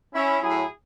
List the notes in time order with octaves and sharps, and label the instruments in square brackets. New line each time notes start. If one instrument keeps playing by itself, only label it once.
[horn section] C#4 E4
A2 F#3 E4 G#4